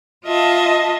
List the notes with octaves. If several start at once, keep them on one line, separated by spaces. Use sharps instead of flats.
F4 D#5 E5 A5